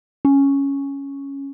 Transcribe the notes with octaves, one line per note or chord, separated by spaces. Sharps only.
C#4